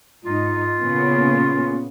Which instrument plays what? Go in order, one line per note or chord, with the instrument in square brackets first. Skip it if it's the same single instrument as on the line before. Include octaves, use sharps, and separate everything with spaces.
[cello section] G#2 D#4 [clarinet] F4
[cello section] A#2 C#3 B3